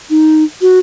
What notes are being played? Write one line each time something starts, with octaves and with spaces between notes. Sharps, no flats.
D#4
F#4